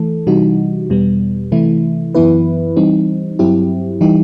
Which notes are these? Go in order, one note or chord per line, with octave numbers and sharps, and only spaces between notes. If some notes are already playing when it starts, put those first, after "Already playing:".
Already playing: E3 A3 A4
C3 E3 G3 D#4 F#4
E2 B2 G3 B3
C3 E3 A3 E4
F#2 E3 B3 E4 B4
E3 G3 C4 D#4
G2 F#3 C4 E4 G4
E3 G3 D#4 G4